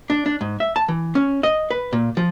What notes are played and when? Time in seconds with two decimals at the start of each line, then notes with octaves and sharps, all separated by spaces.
0.10 D4
0.26 D4
0.41 G#2
0.60 E5
0.76 A5
0.88 E3
1.15 C#4
1.43 D#5
1.71 B4
1.93 A#2
2.17 F3